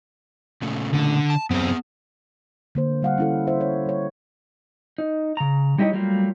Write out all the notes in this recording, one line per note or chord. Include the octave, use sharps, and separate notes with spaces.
A#2 C#3 A3
D3
A5
F#2 B3 C4 G#4
D3 A#3 C5
G3 F5 F#5
C#4 E4 A4
E4 C5 E5
C#5
G3 C#5
D#4
C#3 A#5
G3 D#4 E4 G4 C#5 D#5
F#3 G3 A3 A#3 F4